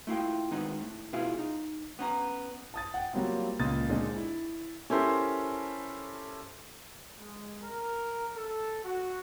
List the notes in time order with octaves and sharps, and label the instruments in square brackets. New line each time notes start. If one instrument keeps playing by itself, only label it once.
[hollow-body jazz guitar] A3 E4 F4 G5
D#3 G#3 B3 C4 D#4
A2
B2 E4 F4 G#4 F5
D#4
B3 C#4 A#5
[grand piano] A5 D#6 A6
F#5 G5
F#3 G3 A#3 C4 F4
C#2 A#2 A#3 D#6 A6
A#2 D3 G#3 C4 D4 D#4
E4
[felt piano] C#4 E4 G4 A4 A#4 C5
[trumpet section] G#3
A#4
A4
F#4